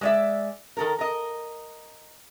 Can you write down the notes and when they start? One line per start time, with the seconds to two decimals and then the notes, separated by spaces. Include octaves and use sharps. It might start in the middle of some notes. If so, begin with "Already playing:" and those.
0.01 G#3 D5 E5
0.77 D#3 A4 A#4
0.99 A#4 D#5